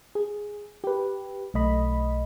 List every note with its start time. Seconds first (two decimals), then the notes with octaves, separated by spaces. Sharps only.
0.15 G#4
0.84 G4 B4
1.54 B1 A3 D#5 B5